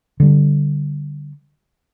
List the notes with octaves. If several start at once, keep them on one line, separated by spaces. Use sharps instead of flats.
D3 G3